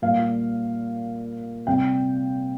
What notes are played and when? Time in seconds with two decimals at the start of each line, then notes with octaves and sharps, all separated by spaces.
0.02 A#2 G3 F5
1.67 C3 G3 G5